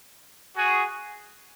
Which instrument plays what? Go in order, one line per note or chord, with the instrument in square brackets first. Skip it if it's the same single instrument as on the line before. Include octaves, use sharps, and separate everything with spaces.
[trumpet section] F#4 G#4